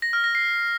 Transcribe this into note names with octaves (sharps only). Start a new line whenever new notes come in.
A#6
F6
A#6
C7